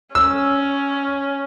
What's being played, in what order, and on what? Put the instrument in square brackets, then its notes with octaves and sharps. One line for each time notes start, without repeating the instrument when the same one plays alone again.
[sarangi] C#4 [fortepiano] E6